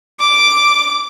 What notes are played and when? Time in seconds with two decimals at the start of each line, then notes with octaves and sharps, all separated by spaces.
0.20 D6